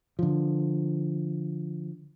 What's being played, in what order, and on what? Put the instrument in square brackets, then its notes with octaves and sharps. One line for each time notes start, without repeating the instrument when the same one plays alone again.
[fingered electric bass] D3 F3